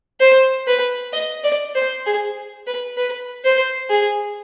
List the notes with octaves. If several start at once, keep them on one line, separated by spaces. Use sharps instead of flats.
C5
B4
D#5
D5
C5
G#4
B4
B4
C5
G#4